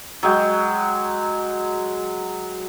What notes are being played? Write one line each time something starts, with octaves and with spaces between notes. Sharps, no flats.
F#3 G#3 G5